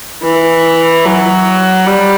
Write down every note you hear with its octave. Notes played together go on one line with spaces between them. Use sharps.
E3
F#3
G3